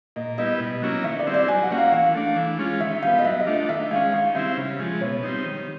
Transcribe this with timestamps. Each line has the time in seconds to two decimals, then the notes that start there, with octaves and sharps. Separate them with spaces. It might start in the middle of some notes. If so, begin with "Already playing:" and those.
0.16 A#2 D#5
0.38 G3 B3 E4 D#5
0.60 B2
0.82 F#3 A#3 C#4 E4
1.04 D#3 E5
1.19 D5
1.27 G3 C4 E4
1.34 D5
1.48 F#3 G#5
1.63 F#5
1.71 A#3 C#4 F#4
1.78 F5
1.92 E3 F5
2.15 A3 D4
2.36 E3
2.59 G#3 C#4 F4
2.80 D#3 E5
3.03 G3 B3 F5
3.18 D#5
3.25 F#3 E5
3.40 D#5
3.46 A3 D4 F4
3.54 D#5
3.69 D#3 E5
3.91 G#3 C#4 F5
4.13 D#3 F5
4.35 G3 C4 E4 E5
4.57 C#3
4.80 F3 G#3
5.01 B2 C#5
5.23 G3 C4 D#4
5.45 D#3